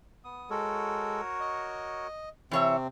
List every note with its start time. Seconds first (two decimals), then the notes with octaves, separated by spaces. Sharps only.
0.24 B3 D#6
0.50 G#3 F#4 A4 A#4 C#5
1.40 D#5
2.51 C3 E3 C4 C#5 E5